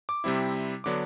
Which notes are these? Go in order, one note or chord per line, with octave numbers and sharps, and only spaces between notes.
D6
C3 G3 C4 E4
D3 F#3 B3 D4 D6